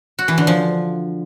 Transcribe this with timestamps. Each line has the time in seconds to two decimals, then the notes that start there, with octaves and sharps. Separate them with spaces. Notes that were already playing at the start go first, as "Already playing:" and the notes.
0.19 F#4
0.28 E3
0.38 D3
0.47 F3